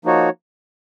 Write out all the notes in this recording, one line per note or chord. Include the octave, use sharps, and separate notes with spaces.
F3 A#3 D#4 F#4 C#5